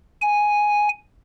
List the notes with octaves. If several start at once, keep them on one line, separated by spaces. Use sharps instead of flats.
G#5